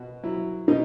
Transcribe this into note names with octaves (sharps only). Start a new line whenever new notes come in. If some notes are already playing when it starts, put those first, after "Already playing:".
Already playing: B2 F#4
F#3 E4
B2 D#4